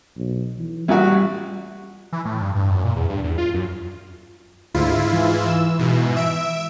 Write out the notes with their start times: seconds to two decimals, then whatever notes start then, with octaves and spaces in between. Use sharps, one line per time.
0.17 B1
0.59 E3
0.88 A1 A#2 G3 F#4
2.12 E3
2.25 A2
2.42 G2
2.55 G2
2.70 F#2
2.85 A#2
2.96 E2
3.09 G2
3.24 E2
3.38 F4
3.54 F#2
4.74 D2 G#2 E4 F4
5.12 E3
5.49 E6
5.79 G#2 B2
6.17 E5 E6 D7